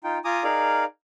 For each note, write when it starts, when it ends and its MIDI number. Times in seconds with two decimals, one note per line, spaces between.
0.04 0.18 63
0.04 0.18 65
0.04 0.18 79
0.25 0.43 65
0.25 0.43 80
0.25 0.43 82
0.25 0.43 86
0.25 0.43 87
0.44 0.84 63
0.44 0.84 68
0.44 0.84 70
0.44 0.84 74
0.44 0.84 77